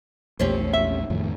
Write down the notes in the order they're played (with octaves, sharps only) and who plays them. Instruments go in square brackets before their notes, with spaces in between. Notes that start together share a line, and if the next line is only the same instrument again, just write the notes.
[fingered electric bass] A#1 E2 A3 [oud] C4 C#4 G4
[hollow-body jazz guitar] E5
[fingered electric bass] F2 A2 D#3